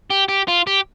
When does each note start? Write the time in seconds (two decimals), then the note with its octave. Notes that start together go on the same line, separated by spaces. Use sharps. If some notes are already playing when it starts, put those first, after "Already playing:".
0.11 G4
0.29 G4
0.48 F4
0.67 G4